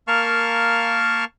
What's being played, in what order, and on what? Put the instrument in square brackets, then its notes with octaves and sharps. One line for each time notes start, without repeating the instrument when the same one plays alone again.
[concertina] A#3 A#4 F5 A5 C#6 F6